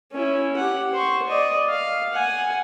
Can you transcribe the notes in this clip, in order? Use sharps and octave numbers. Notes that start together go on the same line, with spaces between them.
C#4 E4
G4 F#5
C5 C#6
D5 D#5
F5
F#5 G#5